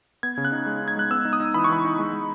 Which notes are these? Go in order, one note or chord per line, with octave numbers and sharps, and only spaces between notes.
B3 G#6
C#3
F#6
D#4
G#3
D#4
G#6
G#3 F#6
B3 E6
D#4
D#6
D#4
E3 B5
C#6
E3 B5
D#4
G#3
G#3